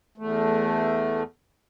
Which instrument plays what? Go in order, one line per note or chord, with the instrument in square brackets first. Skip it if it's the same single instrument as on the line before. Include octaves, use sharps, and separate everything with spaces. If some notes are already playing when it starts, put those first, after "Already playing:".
[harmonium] E2 A3